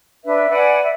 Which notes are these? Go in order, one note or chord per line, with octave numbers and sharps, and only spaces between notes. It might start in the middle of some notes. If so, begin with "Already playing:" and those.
D4 B4 E5
B4 D5 F#5 G#5
E5